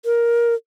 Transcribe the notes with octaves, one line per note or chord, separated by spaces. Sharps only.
A#4